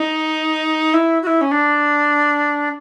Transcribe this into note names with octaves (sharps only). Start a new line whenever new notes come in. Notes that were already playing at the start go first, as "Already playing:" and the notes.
Already playing: D#4
E4
F#4
E4
C#4
D4